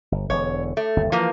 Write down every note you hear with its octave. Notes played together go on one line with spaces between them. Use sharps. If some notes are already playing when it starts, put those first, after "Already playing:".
G1
E1 D3 C#5
A3
G1 D#2
E3 F3 A#3